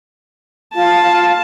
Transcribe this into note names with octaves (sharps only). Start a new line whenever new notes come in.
F4 F5 A5